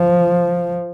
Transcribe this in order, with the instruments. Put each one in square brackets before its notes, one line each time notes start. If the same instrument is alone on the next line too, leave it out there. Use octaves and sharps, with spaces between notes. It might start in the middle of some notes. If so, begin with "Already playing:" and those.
Already playing: [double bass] F3